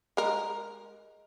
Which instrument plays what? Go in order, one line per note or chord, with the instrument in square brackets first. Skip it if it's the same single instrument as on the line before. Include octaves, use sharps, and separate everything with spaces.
[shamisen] G#3 A#4